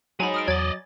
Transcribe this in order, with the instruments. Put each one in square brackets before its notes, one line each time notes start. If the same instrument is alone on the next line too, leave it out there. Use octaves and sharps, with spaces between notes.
[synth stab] F#3 [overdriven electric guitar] G#3 D#4 [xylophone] G#5 B5
[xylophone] D#6 F6 D7
[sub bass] E2 [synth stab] F#3 A6 [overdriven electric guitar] D5 D#5 [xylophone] G#6